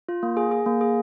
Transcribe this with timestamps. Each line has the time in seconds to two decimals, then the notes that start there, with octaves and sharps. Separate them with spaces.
0.09 F4
0.23 A#3
0.37 G#4
0.51 G#4
0.66 A#3
0.81 G#4